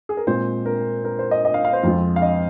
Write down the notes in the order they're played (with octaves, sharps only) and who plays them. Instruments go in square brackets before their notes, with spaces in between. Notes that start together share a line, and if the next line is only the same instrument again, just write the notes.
[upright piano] G#4
A#4
A#2 G#3 C4 F4 C5
A#4
A#4
C5
D#5
D#5
F5
F5
C5
F2 F3 G#3 F4
F5
D#5